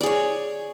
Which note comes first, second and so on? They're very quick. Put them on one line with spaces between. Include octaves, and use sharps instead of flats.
D5 G#4 C#5